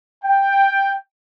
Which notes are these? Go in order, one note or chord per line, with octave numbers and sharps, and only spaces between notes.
G5